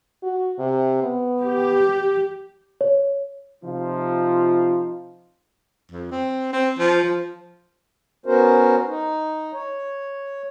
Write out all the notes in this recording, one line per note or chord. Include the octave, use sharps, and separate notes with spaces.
F#4
C3
B3
G4
C#5
C3 F3 D#4 F4
F2
C4
C4
F3
F3
B3 C#4 F#4 A#4 C5
D#4
C#5